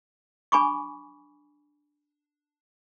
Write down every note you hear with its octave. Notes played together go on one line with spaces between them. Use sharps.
D4 G#5 B5 C#6 D6